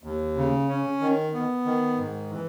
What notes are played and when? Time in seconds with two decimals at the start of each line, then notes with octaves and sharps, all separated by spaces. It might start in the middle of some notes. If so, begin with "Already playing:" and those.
0.04 D#2
0.36 C#3
0.69 C#4
1.01 D#3
1.33 B3
1.66 D#3
1.98 G#2
2.31 E3